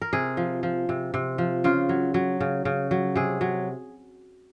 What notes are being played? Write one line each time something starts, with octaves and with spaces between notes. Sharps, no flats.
A#4
C3 G#4
F3
F3
C3
C3
F3
C#3 F4
F#3
F#3
C#3
C#3
F#3
C3 G#4
F#3